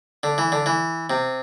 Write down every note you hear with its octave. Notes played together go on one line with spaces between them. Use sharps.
D3
E3
D3
E3
C3